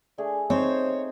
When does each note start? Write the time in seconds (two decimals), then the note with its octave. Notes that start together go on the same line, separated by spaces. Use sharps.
0.18 A3 D4 G#4
0.50 C4 D#4 C5 C#5